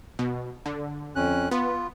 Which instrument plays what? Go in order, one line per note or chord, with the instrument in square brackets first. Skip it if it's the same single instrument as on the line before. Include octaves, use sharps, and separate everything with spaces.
[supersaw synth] B2
D3
[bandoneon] F2 C#4 F#6
[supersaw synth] B3 [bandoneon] F4